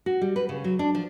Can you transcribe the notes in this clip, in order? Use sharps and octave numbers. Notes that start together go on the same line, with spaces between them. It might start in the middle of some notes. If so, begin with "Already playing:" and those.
F#4
G3
B4
C#3
F#3
D4
F3